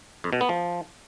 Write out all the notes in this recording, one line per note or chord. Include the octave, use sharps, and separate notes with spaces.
F2
B2
B3
F3